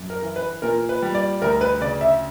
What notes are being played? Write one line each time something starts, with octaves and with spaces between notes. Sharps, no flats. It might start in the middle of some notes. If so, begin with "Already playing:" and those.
Already playing: F#2
A#4
E3
B4
A#2 A#4
B4
G3
D5
D2 A#4
B4
C#3 D5
E5